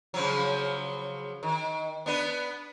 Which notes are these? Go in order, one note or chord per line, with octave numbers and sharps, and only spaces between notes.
C#3 F3 F#3
D#3
B3 D4 B4